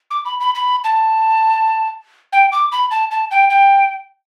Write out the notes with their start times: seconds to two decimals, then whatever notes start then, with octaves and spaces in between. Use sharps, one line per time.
0.11 D6
0.25 B5
0.40 B5
0.55 B5
0.84 A5
2.33 G5
2.52 D6
2.72 B5
2.91 A5
3.11 A5
3.31 G5
3.50 G5